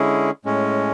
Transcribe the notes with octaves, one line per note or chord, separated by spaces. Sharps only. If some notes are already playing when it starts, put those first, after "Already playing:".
Already playing: D3 G#3 C#4 E4 G#4
A2 G#3 C#4